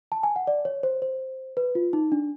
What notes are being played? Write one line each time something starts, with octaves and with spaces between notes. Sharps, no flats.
A5
G#5
F#5
D5
C#5
C5
C5
B4
F4
D#4
D4